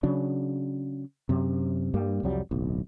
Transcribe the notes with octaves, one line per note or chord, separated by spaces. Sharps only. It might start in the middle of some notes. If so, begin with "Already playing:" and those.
C#3 F#3 D4
F#2 C3
G2 G3 A#3
C2 F2 F#3 G3
D1 B1